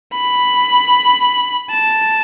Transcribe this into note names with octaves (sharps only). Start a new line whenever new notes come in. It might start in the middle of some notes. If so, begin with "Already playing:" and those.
B5
A5